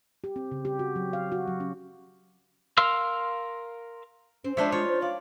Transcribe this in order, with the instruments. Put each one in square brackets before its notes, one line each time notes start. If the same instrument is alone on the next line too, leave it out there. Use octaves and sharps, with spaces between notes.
[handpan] G4
C4
C#3
G4
F#4
F#3
F5
F#4
F#3
C#4
[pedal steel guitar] A#4 F5 C6 E6 F6
[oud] C4 [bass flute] C#4
[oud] F3 [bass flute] G#3 [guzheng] D4 C5 C#5 [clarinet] E5
[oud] D#4 [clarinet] F4 [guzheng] C#5
[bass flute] C5
[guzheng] D5 [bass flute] F5